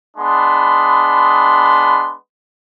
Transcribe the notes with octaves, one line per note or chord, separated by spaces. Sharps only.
G#3 B3 D4 B5 C6